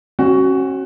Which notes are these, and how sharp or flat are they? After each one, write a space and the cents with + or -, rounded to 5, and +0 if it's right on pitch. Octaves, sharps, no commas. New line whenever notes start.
C#4 -35 F#4 +15